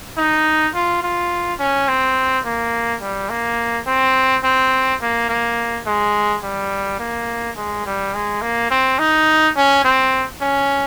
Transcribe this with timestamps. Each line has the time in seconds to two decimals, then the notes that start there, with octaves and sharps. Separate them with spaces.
0.18 D#4
0.75 F4
1.03 F4
1.59 C#4
1.88 C4
2.45 A#3
3.02 G3
3.30 A#3
3.87 C4
4.43 C4
5.02 A#3
5.29 A#3
5.86 G#3
6.43 G3
6.99 A#3
7.57 G#3
7.86 G3
8.14 G#3
8.42 A#3
8.70 C4
8.99 D#4
9.56 C#4
9.84 C4
10.42 C#4